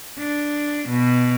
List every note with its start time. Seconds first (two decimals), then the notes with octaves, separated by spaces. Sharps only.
0.19 D4
0.89 B2